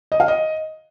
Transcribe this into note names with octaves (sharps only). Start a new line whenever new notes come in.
D#5
F5
D#5